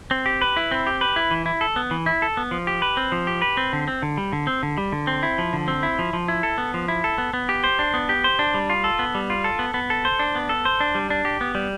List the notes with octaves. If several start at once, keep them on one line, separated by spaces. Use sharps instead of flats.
C4
G4
B4
E4
C4
G4
B4
E4
E3
E4
A4
B3
E3
E4
A4
B3
F3
G4
B4
C4
F3
G4
B4
C4
D3
C4
D3
G3
D3
C4
D3
G3
D3
C4
E4
F3
D3
C4
E4
F3
F3
E4
A4
B3
F3
E4
A4
B3
B3
G4
C5
D4
B3
G4
C5
D4
G3
F4
A4
B3
G3
F4
A4
B3
B3
A4
C5
D4
B3
A4
C5
D4
G3
D4
G4
B3
G3